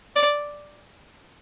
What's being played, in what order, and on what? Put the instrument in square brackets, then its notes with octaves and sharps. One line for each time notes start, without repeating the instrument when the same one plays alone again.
[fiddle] D5